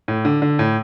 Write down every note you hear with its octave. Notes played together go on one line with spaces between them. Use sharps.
A2
D3
D3
A2